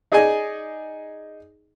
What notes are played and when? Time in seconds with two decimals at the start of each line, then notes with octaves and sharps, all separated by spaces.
0.12 D#4 G#4 D5 D#5 G#5